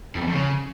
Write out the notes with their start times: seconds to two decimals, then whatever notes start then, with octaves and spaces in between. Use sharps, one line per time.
0.15 F2
0.21 E2
0.27 F2
0.33 C#3